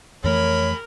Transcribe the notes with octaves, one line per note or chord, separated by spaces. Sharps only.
F2 E3 A3 G4 G#4 A#4 C#5 B5